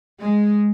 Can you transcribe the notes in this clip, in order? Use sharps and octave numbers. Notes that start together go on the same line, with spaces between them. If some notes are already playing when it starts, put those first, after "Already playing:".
G#3